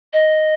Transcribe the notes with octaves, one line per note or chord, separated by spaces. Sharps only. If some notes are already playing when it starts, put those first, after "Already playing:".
D#5